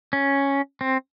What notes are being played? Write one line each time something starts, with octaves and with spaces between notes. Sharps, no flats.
C#4
C4